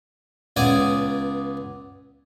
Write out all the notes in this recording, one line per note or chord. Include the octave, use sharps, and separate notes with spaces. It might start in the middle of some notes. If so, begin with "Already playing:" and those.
C#2 B3 G#4 D5 D#6